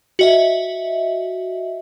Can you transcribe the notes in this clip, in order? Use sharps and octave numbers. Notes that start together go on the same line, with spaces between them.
F#4 D#5 E5